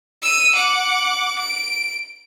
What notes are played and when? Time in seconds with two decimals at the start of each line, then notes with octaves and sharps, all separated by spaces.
0.22 E6 D#7
0.55 F#5 D6
1.39 D7